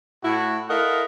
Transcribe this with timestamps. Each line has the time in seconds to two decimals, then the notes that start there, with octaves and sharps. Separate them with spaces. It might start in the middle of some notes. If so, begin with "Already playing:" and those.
0.23 A2 E4 F#4
0.69 E4 A4 A#4 D#5 F5 F#5